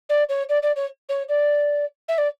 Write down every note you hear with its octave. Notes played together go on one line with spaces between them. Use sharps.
D5
C#5
D5
D5
C#5
C#5
D5
E5
D5